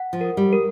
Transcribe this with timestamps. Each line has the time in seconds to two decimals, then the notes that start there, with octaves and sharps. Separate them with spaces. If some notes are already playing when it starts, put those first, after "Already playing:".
Already playing: F#5
0.13 F3
0.21 A#4
0.37 G3
0.53 A#4